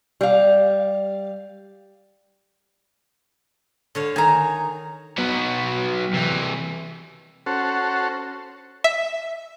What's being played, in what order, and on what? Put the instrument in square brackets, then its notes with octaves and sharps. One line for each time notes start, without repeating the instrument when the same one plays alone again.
[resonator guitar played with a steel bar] G3 F5
[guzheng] D3 C#5 F5
[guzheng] D#3 [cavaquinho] G#5 A#5
[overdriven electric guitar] F#3 B3
C3 E3
[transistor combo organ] C#4 F#4 A4 C5
[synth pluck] E5